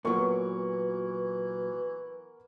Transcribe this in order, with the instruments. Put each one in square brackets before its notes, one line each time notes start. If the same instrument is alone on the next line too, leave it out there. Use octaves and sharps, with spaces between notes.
[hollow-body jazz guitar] A#2 F#3 [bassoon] E3 [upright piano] B3 A#4 C#6